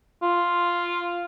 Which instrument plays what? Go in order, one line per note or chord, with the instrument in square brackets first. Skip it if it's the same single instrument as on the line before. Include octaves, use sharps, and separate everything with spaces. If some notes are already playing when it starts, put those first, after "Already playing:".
[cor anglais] F4